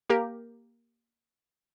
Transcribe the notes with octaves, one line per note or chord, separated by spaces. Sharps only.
A#3 G4 A#4